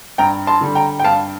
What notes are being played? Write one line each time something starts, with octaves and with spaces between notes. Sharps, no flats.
G2 G5 A#5
A5 C6
D3 G3
G5 A#5
G5
G2 F5 A5